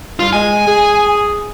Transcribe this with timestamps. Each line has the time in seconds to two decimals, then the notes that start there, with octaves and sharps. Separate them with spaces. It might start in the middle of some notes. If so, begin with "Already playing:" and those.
0.19 G2 F4 F5
0.33 G#3 G#5
0.67 G#4